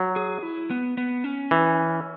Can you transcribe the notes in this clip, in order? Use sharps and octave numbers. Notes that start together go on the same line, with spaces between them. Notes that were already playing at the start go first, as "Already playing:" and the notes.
Already playing: F#3
G#4
E4
B3
B3
C#4
E3